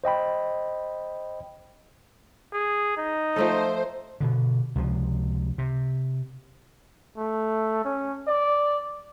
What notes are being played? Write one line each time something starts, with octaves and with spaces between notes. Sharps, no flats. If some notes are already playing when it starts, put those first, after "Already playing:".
C5 D#5 G5 B5
G#4
D#4
F3 A3 A4 C5
B2 D3
C#2 C3 E3 F3
C3
A3
C#4
D5